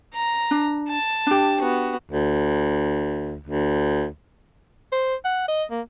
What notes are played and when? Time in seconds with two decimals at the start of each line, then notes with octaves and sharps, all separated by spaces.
0.14 A#5
0.51 D4
0.89 A5
1.27 D4 G4
1.60 B3 F#4
2.10 D2
3.47 D2
4.92 C5
5.25 F#5
5.48 D#5
5.71 A#3